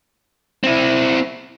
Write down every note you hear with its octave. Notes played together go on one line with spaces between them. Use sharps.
C4 E4